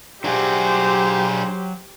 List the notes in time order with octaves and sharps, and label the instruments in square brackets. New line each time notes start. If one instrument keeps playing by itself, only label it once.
[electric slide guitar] F#3 [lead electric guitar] D4 G#4 [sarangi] G4 [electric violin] C5